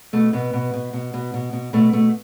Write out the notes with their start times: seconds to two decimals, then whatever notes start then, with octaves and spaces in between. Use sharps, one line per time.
0.13 B2 A3
0.33 B2 B3
0.53 B2
0.74 B2
0.93 B2
1.14 B2
1.34 B2
1.53 B2
1.73 B2 A3
1.93 B2 A3